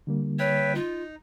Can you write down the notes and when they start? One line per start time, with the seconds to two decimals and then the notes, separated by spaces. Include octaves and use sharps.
0.07 D3 G3 A#3
0.39 B4 C#5 E5 G5
0.75 D#4 F4